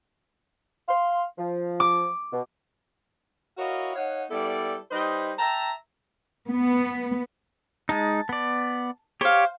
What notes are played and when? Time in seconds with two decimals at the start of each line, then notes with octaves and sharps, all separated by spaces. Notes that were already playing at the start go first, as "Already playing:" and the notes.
0.88 F5 C6
1.38 F3
1.80 D6
2.33 B2
3.58 E4 F#4 A#4 C#5 D#5 F5
3.95 D#4 C#5 F5 F#5
4.31 G3 B3 E4 A4 D5
4.91 G3 D#4 B4 C5 D#5
5.39 E5 G5 A5 A#5
6.48 B3
7.89 G#3 D#4 A5
8.29 B3 D5
9.21 G4 C5 C#5 F5